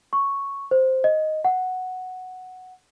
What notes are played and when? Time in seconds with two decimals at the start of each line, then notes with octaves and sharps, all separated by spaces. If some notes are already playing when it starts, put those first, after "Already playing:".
0.13 C#6
0.71 C5
1.04 D#5
1.45 F#5